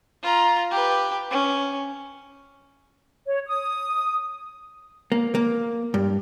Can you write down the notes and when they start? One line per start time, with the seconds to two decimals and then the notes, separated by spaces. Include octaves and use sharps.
0.23 F4 A#5
0.71 G4 B4
1.30 C#4
3.26 C#5
3.47 D#6
5.12 A#3
5.35 A#3
5.94 G2